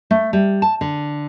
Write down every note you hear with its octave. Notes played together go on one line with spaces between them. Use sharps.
A3
G3
A5
D3